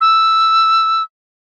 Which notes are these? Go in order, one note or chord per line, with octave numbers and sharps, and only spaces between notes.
E6